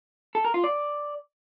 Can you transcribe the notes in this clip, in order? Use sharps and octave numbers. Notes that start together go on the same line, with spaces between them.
A4
A#4
F4
D5